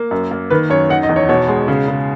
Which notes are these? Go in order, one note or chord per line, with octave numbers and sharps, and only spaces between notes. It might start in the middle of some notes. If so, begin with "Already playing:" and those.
Already playing: A#3
F#2
A#3
D#3 B4
F#2 C#5
D#4 F#5
D#5
E2
C#5
B2 C#5
G#3
C#3
C#3